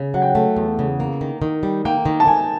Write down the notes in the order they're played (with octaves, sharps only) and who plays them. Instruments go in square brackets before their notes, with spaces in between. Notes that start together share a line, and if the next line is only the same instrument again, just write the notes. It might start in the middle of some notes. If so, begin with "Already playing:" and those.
Already playing: [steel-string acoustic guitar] C#3
[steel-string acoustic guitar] F#3 [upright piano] F#5
[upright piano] G5
F#5
[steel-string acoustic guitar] A3
E2
C#3
A#3
D#3
D#3
G3
[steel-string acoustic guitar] A#3 [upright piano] G5
[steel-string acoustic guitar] D#3
[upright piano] A5
[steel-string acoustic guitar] D#3 [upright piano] G#5